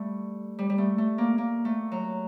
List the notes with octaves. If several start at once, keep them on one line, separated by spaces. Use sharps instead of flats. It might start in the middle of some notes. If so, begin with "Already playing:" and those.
Already playing: G3 A3
G3
G3
A3
A3
A#3
A#3
A3
F#3